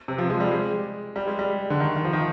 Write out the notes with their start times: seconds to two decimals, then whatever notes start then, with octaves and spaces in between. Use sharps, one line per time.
0.08 C3
0.18 F3
0.30 G#3
0.40 G3
0.51 G#3
1.16 G3
1.27 G#3
1.39 G3
1.70 D3
1.80 D#3
1.96 D#3
2.05 F3
2.13 D#3